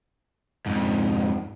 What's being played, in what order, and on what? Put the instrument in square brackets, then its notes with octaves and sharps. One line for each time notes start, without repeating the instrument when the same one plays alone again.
[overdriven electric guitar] F2 G#2